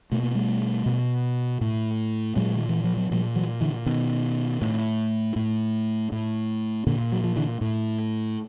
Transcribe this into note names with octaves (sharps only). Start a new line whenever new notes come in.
B2 A3
A#3
G3 A3
B2
A2
A#2 F#3 G#3
D#3
E3
F3
F#3
A#2 F3 G3
E3 F#3
D3 E3
B2 D#3
A2
A2
A2
A#2 D3
F#3
F3
D3 E3
A2